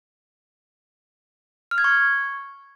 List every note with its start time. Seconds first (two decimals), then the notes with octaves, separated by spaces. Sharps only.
1.71 F6
1.78 G#6
1.84 C#6